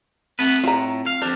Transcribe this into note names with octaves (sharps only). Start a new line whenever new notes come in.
A3 B3 C4 B4
A2 F4 A#5
F5
F2 D4 C5